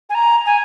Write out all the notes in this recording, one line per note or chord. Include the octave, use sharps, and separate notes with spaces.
G#5
A#5
G#5